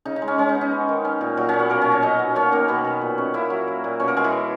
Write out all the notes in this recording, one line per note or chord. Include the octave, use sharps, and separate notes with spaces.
C#3 D#4
D#4
G#3
C#4
G#3 C#4
D#4
B3
D#4
B3
D#3
C#4
A#2
A#2 F#3 F#4
A#2 C#4 C#5
B3 B4
B2 A#3 A#4
B2 C#4 C#5
C#4 C#5
F#3 D#4 D#5
B3
A#3 C#4 C#5
D#3 A#3 A#4
B2 B3 B4
B2
A#2
C#4
A#3 E4 E5
F#3
A#3
A#2
B2 C#4 C#5
A#3 A#4
B2 G#3 G#4
E3 E4
C#4